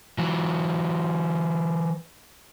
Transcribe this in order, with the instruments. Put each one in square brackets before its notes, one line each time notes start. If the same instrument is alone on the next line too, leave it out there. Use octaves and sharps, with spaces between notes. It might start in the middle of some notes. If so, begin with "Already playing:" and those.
[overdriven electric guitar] E3 F#3